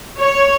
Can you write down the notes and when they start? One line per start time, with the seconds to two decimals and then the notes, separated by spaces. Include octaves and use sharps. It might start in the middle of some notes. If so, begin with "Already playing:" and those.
0.19 C#5